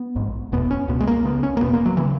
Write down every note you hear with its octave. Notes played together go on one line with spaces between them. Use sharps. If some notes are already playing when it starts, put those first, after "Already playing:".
Already playing: B3
A#1 G#2
F#1 E2 B2 B3
C#4
C#2 B2 B3
G#3
A#3
C#2 C#3 B3
C#4
A#3
F#1 E2 B2 B3
A#3
F#3
C#3 E3